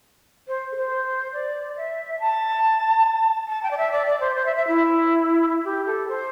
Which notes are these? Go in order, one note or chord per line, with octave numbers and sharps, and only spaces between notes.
C5
A4
C5
D5
E5
A5
A5
G5
D5
E5
D5
D5
C5
C5
E5
E5
E4
G4
A4
C5